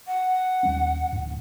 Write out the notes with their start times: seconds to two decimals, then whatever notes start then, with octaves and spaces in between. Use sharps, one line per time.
0.07 F#5
0.63 D#2 G3 C#4
1.12 D1 G#2